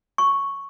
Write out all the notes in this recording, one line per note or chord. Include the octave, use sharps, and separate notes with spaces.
C#6